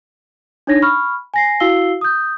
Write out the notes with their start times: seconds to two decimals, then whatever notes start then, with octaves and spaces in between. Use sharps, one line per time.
0.67 D4 D#4 C#5 G#6 A#6
0.82 B5 C#6 F6
1.34 G#5 A#6 C7
1.60 E4 F#4 F5 E6 C7 G7
2.01 D#6 G6